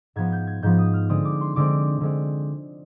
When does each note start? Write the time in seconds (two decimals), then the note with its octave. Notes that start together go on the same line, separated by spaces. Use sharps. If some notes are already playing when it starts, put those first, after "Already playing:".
0.16 G#2 F3 B3 G#6
0.32 G6
0.47 G#6
0.63 G#2 F3 B3 G6
0.78 D#6
0.94 F6
1.09 D3 G#3 C4 D#6
1.25 D6
1.41 C6
1.56 D3 G#3 C4 D6
2.01 D3 G#3 C4